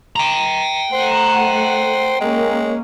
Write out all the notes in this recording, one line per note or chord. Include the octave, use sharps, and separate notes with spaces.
G5 A#5
A3 C5 F#5
G#3 A#3 C#4